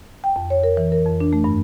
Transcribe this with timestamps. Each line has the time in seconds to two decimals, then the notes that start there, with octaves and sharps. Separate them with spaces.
0.24 G5
0.36 F2
0.50 C#5
0.63 A#4
0.77 E3
0.92 A#4
1.07 F2
1.20 D4
1.33 A3
1.44 G2